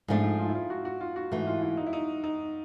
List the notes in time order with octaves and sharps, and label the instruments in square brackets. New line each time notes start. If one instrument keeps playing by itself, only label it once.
[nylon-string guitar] G#2 F3 A3 D4 [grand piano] D#4
[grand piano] E4
F4
E4
F4
F#4
F#4
F4
F#4
[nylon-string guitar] G#2 E3 A3 [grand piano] F#4
[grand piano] F4
E4
D#4
E4
D#4
D#4